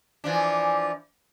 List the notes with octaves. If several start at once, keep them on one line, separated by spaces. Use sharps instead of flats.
E3 F3 D4